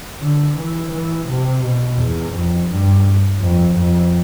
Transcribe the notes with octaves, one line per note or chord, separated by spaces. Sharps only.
D3
E3
E3
C3
B2
E2
F2
G2
F2
F2